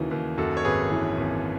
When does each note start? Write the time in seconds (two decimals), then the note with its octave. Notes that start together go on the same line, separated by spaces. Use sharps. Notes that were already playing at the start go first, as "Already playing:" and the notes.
Already playing: D#2 C#3 E3 D#4 F#4
0.11 D#2
0.38 F#2 F#4 A4
0.57 C#5
0.64 G#1 G#4 B4
0.91 E3
1.18 G#1